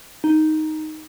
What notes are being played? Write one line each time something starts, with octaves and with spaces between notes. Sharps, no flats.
D#4